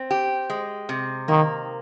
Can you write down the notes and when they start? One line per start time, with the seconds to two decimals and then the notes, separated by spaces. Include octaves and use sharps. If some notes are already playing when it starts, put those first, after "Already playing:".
Already playing: C4
0.11 G4
0.50 G#3
0.89 C3
1.28 D#3 A#3